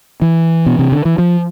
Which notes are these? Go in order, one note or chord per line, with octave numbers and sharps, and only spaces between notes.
E3
B2
C3
D3
E3
F3